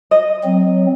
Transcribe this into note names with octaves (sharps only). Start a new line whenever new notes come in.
D#5
F#3 C4